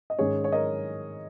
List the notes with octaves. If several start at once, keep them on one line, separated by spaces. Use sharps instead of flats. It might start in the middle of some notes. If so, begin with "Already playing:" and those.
D#5
G#2 D#3 C#4 G#4 C#5
C#5
A#4 D#5